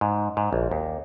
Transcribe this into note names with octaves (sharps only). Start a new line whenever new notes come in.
G#2
G#2
A#1
D#2